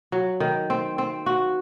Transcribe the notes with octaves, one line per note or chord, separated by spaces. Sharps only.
F#3
D#3
C4
C4
F#4